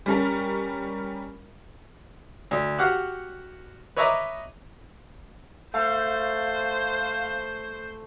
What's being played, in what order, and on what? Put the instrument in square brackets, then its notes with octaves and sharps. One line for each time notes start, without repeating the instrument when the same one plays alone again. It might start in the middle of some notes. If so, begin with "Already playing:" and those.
[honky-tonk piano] G3 C#4 A#4
[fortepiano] D2
F#4 G4 F5 F#5
B4 C#5 D#5 E5 A#5 D6
[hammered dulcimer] A3 [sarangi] C5 [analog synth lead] F5